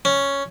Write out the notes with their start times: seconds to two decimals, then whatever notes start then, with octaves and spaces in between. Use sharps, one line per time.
0.05 C#4